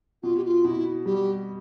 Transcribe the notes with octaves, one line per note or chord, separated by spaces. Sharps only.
B2 F4
G4
F4
B2 E4
G3 G4